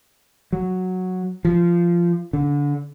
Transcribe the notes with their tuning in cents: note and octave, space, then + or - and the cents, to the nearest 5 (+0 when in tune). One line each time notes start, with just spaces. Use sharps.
F#3 -5
F3 -15
D3 -25